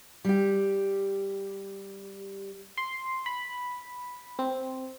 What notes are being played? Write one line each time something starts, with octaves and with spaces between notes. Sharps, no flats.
G3 G4
C6
B5
C4